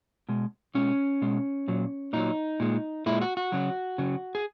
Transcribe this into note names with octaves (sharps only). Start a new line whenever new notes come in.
B2 G#3
B2 G#3 C#4
B2 G#3
A#2 F#3
A#2 F#3 D#4
A#2 G#3
A#2 G#3 E4
F#4
F#4
C#3 F#3
C#3 F#3
G#4